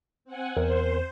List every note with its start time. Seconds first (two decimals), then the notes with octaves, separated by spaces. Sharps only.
0.25 C4 F#5 G#5
0.57 E2 A#4 C5